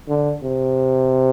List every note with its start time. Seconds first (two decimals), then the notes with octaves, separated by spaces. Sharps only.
0.08 D3
0.43 C3